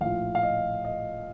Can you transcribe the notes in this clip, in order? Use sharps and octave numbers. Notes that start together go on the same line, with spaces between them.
A#1 A2 F3 F5
F5
D#5
D#5